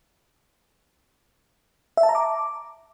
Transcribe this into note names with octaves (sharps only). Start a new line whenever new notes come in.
E5
A5
A#5
D6